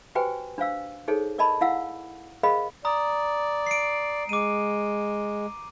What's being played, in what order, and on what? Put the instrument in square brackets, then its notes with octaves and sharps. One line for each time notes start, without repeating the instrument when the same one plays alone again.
[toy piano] F#4 G4 B4 C5 G5 G#5
D4 C5 F5 E6
D#4 G#4 A4 C5 C#5
A#4 D5 D#5 A5 B5
E4 F5 F#5 E6
G#4 A#4 C5 D#5 F5 B5
[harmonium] D5 [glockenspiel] A#5 D#6
[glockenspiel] C7 D7
[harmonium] G#3 [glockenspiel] D6 D#7